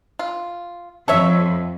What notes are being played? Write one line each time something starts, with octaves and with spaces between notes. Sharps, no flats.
F4
F2 A4 C#5 E5